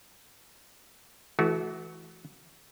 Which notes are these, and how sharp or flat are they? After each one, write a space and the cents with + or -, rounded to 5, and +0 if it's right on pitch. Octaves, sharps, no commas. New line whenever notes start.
E3 +0 A3 -35 F#4 +0